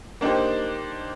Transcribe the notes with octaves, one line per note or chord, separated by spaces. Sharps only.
A#3 D4 D#4 G4 C5